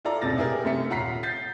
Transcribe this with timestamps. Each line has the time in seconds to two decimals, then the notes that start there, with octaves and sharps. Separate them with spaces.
0.05 E4 F4 A4 D5 A#5
0.21 E1 A1 C3 A6 A#6
0.37 D#4 E4 G4 G#4 A#4
0.65 F#2 C3 A3 E5 C#7
0.90 D#1 F4 F#5 A#5 B6 C7
1.23 G6 A6 B6 C7